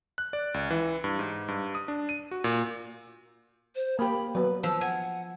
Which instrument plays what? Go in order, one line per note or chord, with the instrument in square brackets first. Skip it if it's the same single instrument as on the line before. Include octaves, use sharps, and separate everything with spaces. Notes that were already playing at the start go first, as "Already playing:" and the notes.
[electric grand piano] F#6
D5
C#2
E3
G2
G#2
G2
D#6
D4
D#7
F#4
A#2
[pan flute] C5
[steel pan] A#3 G4 [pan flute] B5
[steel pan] F#3 B3 [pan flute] B4
[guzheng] F3 [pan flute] E6
[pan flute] F#5 [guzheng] G#5